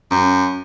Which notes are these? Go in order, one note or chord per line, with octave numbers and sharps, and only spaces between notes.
F#2